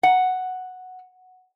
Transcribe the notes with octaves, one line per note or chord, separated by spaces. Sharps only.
F#5